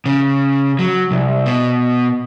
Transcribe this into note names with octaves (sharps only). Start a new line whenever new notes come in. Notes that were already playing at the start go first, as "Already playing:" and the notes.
C#3
F#3
C2
B2